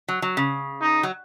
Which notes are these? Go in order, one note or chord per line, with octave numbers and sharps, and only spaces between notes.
F#3
F#3
C#3
D#4
F#3